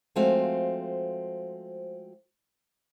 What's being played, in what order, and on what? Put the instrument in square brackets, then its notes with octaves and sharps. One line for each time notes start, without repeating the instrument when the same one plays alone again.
[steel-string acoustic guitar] F3 G#3 A3 C4 F#4 F5